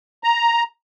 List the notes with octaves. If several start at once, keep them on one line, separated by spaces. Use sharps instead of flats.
A#5